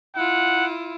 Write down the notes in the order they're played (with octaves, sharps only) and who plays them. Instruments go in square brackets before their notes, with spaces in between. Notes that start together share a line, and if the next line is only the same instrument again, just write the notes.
[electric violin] E4 F4 [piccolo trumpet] F#5